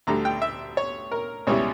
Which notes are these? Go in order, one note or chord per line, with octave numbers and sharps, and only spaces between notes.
D2 D3 G3 A#5
G5
E5
C#5
A#4
C#2 B2 G3 C#4 E4 C#5